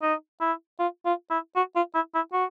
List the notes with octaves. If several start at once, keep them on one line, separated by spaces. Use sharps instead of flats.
D#4
E4
F4
F4
E4
F#4
F4
E4
E4
F#4